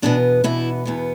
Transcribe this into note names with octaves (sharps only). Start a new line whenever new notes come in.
E2 B2 B3 D4
E2 B2 B3 E4
E2 B2 B3